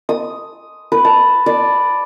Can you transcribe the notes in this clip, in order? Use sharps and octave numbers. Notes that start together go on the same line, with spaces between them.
D#6
B4
A5
D5